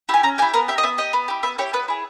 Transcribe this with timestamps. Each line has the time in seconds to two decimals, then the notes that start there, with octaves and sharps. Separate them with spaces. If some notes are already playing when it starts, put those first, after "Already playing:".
0.09 E4 G4 G#5
0.23 C#4 A#5
0.38 G4 G#5
0.42 E4
0.54 B3 A#4
0.68 G4 E5
0.78 D#5
0.83 B3 E5
0.98 G4 D#5
1.13 B3
1.28 E4 G4
1.43 B3 E5
1.58 E4 G4 C#5
1.73 B3 B4
1.88 E4 G#4